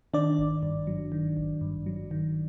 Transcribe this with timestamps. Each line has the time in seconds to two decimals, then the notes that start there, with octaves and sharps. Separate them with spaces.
0.13 D#3 D4 D5
0.39 G#1
0.63 G2
0.87 F#3
1.12 D#3
1.37 G#1
1.61 G2
1.86 F#3
2.11 D#3